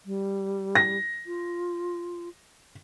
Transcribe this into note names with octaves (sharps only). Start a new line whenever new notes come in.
G3
A#6
F4